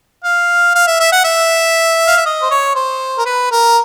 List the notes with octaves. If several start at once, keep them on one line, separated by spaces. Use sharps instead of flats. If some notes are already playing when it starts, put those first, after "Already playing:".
F5
F5
E5
E5
F#5
E5
F5
E5
D#5
C5
C#5
C5
A#4
B4
A#4